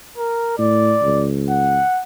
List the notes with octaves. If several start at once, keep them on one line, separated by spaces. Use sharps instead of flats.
A#4
A2 D5
C#2
F#5